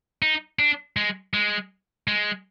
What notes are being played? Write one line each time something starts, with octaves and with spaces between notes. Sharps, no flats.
D#4
D4
G#3
G#3
G#3